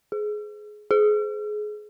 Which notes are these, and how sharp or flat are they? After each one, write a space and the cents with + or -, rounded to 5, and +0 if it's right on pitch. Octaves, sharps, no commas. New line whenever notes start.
G#4 +20
G#4 +25